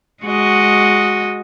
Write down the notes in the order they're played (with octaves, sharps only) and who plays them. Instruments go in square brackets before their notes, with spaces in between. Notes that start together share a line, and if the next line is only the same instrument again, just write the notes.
[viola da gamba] G#3 F#4 D#5